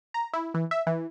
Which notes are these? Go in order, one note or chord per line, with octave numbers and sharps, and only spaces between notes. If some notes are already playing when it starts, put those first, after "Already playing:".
A#5
E4
E3
E5
E3